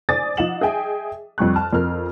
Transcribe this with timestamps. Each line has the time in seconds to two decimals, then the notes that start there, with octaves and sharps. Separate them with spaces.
0.09 C5 D5 G#5 D6 D#6 A6
0.37 F3 D#4 F5 F#5 E7 F#7
0.61 G#4 D#5 E5 G5 G#5
1.38 F2 G3 C#6 F#6
1.56 A5 F6
1.73 F2 A#4 F6